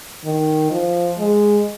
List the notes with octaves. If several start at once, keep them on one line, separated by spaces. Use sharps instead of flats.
D#3
F3
G#3